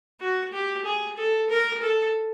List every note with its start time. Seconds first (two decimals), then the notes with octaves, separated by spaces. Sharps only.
0.20 F#4
0.53 G4
0.84 G#4
1.17 A4
1.50 A#4
1.82 A4